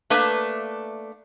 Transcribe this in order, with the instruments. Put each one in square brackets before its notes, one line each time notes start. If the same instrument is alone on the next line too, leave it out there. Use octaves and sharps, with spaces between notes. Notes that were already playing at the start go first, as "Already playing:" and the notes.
[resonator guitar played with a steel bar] A3 A#3 D4 B4 E5